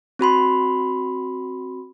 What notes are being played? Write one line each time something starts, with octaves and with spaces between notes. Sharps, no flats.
C4 F#4 B5 C6